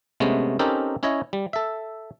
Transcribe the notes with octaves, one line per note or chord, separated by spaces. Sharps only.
C3 G#3 A3 B3 C#4
C4 C#4 D#4 G4 A4 A#4
C#4 E4 C#5 D#5
G3
A4 E5